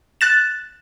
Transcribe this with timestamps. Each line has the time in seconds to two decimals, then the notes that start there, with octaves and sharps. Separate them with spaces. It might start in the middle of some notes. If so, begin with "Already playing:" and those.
0.21 F#6 A6 E7